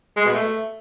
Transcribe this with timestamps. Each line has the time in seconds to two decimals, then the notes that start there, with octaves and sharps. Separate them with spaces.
0.16 G#3
0.25 B2
0.34 A3